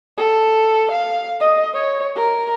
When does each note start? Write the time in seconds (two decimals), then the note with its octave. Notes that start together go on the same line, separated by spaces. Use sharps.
0.18 A4
0.92 F5
1.40 D#5
1.74 C#5
2.16 A#4